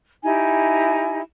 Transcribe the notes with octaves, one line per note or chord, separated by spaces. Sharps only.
D#4 E4 G4 G#5